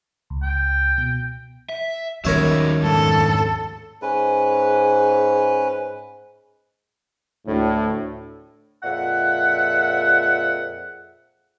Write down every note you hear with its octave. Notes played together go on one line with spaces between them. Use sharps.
C#2
G5
B2
E5
D#2 F#3 G3 C#4 D#4 A#4 C#5 E5
F2 G#2 A4
G#2 C#4 B4
D2 A2
F2 A#2 G#4 E5 F#5